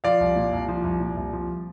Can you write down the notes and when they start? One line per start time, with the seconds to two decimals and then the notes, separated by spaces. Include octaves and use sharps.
0.04 F3 D5 F5
0.20 C2
0.36 A#2
0.53 C2
0.68 F3
0.84 C2
1.00 A#2
1.17 C2
1.33 F3